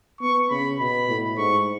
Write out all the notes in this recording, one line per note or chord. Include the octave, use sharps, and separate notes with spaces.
B3 C#6
C#3 B5
B2 B5
A2
G#2 C#6